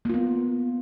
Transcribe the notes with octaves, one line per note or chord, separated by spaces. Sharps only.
A#3 B3 F4